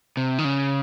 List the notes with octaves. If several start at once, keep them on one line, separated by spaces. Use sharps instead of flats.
C3
D#3
C#3